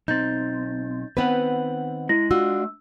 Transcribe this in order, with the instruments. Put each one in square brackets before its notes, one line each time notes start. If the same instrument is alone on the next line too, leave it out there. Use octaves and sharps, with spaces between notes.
[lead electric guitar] B1 C4 [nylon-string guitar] D#4 [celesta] G6 A6
[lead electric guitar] D#3 F#5 [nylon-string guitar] B3 C4 B4
[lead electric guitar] G#3 [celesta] E4 A#6
[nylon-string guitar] D4 F4 F#4 [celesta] E6